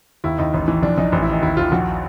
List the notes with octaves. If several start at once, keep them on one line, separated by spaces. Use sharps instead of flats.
D#2 E4
D#2 D#4
A1
E3
A#1 D4
A#1 D#4
A1
E4
D#3 D#4
D#2 E4
D#2 F4
A#1 F#4